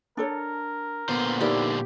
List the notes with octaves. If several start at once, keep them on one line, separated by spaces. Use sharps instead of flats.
D4 A4 A#4 C#5
A#2 D3 B3 C5
D#4 E4 G4 A#4 D5